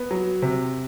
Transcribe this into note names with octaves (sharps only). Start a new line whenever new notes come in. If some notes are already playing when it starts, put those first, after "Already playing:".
Already playing: B3
F#3
C3